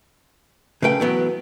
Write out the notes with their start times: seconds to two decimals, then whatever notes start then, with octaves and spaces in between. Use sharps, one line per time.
0.82 C#3 A3 B4 G5
1.00 E3 F#3 B3